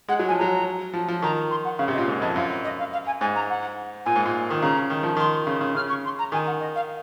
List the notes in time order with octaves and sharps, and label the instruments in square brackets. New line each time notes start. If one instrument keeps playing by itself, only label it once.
[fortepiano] G#3 [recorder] F#5
[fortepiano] F#3
[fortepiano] F3 [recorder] G#5
[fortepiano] F#3 [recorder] A#5
[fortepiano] F3
F3
[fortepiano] D#3 [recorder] A#5
[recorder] C6
F#5
[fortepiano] C#3 [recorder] F5
[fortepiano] C3
[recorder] D#5
[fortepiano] A#2
G#2
[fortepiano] F2 [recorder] D#5
[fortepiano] F#2 [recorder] F5
[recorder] D#5
F5
F5
G#5
[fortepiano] G#2 [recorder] G#5
[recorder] A#5
F#5
[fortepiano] A#2 [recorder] G#5
[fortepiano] G#2
A#2
D#3
[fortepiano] C#3 [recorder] A#5
[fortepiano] D#3
F3
[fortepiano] D#3 [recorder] C6
[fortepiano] C#3
C#3
[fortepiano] C#3 [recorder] F6
[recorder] C#6
C6
A#5
[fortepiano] D#3 [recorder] G#5
[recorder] F#5
D#5
F5